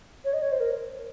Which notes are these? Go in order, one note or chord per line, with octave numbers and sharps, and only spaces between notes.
C#5
D#5
C#5
C5
A#4